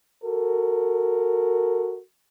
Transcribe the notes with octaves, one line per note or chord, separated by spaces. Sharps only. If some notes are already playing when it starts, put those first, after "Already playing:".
F#4 A4 A#4